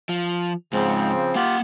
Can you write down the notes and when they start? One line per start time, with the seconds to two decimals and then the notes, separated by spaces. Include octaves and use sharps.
0.09 F3
0.73 G#2 C#3 F3 C4
1.35 A#3 F4 G4 F#5